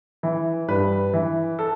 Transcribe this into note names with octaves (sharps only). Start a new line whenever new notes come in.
E3
G2 B4
E3
A4